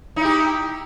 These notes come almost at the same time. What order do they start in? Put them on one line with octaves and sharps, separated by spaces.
D#4 E4 G4